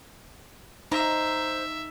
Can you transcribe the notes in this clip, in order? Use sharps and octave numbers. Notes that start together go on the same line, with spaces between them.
D#4 C5 E5 A#5